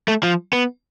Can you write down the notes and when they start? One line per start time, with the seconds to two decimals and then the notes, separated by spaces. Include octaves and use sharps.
0.08 A3
0.23 F3
0.53 B3